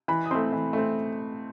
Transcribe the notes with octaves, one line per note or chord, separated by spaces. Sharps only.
E3 B5
D#6
A3 C4 C6
E3
A3 C4